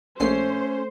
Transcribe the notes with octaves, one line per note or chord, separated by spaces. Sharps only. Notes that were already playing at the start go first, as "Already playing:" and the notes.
A#1 A3 C#4 C5 C7